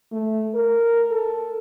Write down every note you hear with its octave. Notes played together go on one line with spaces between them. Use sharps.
A3
A#4
A4